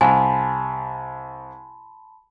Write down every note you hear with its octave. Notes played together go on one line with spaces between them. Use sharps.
C2 G#5 A5 B5 C6